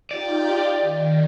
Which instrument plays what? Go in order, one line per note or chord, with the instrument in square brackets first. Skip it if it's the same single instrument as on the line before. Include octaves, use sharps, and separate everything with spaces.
[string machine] D#4 F4 G4 [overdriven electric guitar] D5
[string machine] D#3